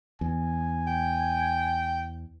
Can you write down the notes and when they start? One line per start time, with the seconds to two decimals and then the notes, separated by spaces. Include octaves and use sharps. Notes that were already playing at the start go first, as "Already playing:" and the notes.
0.21 E2 G#5
0.87 G5